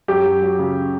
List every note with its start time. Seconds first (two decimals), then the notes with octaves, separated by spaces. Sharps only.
0.08 F#2 G4
0.25 F#3
0.41 F#3
0.59 C#3